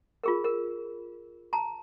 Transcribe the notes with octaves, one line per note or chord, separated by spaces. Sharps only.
F4 G#4 A#4
A#4
A5 A#5